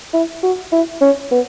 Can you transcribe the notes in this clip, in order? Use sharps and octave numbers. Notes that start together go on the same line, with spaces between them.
E4
F#4
E4
C#4
B3